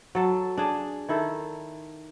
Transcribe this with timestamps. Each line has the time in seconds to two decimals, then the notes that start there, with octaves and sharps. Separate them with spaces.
0.15 F#3 A4
0.58 D4 G#4
1.09 D#3 E4 A4